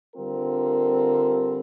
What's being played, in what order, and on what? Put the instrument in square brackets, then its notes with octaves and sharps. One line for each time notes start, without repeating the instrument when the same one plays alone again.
[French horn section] D3 G3 C4 F4 A#4